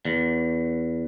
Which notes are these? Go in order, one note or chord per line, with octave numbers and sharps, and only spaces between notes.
E2